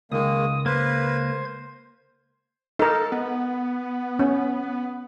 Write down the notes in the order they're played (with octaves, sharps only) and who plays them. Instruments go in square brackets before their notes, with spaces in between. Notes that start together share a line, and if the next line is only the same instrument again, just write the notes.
[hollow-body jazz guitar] C#2 [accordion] D#3 G#3 A#3 [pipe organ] D#6
[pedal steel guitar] A#3 [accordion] B4 [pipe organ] C5 G#6
[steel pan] D#4 A#4 [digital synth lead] A4
[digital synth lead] B3
[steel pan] C#4